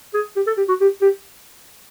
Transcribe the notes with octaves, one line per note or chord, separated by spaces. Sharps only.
G#4
G4
A4
G4
F#4
G4
G4